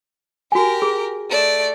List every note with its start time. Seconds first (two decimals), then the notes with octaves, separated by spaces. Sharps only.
0.52 F#4 G4 A#4 G#5
0.82 G#4
1.30 A3 D5